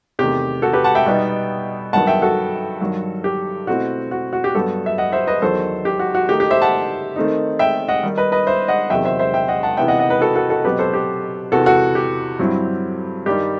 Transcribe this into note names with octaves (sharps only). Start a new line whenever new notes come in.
E2 C3 D#3 A3 G4
F#4 A4
G4 B4
F#5 A5
E5 G5
B2 G3 B3 D#4
G2 D#3 F#3 B3 F#5 A5
E5 G5
F#4 A4
G2 D#3 F#3
G4
B2 A3 C4 E4 F#4
F#4
F#4
G4
G2 F#3 B3 F#4 A4
E5
D#5 F#5
C5 E5
B4 D#5
E2 D#3 F#3 A4 C5
G4
F#4
F#4
D#3 A3 D#4 G4
G4
C5 E5
F#5 A5
D#3 A3 C4 D#4
E5 G5
D#5 F#5
D#3 G3 D#4
B4 D#5
B4 D#5
C5 E5
D#5 F#5
E2 C3 D#3 F#3 E5 G5
C5 E5
C5 E5
E5 G5
D#5 F#5
F#5 A5
C3 E3 B3 D#4 E5 G5
D#5 F#5
D#5 F#5
B4 D#5
F#4 A4
F#4 A4
F#4 A4
B2 F#3 C4 G4 B4
A4 C5
G4
E2 C3 E3 B3 F#4 A4
F#4 A4
G4
G2 F#3 C4 E4
G2 D#3 G3 D#4 G4